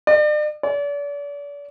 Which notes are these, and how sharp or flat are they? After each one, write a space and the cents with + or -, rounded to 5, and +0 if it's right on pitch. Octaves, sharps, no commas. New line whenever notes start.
D5 +40
D5 -40